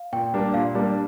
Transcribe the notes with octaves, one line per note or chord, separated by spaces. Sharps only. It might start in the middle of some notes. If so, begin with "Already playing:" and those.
Already playing: F5
A#2 G5
G3 A#3 D4
A#2 F5
G3 A#3 D4